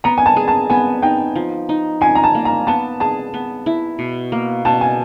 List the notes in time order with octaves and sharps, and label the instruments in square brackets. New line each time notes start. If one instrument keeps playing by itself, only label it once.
[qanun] B3 [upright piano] A#5
[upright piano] G#5
A5
[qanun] G#4
[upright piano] A5
[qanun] B3 [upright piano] G#5
[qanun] D#4 [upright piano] G5
[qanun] F3
D#4
[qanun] F3 [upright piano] G#5
[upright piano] A#5
A5
[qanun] A#3
[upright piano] A#5
[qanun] B3 [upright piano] A5
[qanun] G#4 [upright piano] A5
[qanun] B3
E4
B2
A#3
[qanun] B2 [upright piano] A5
[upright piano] G#5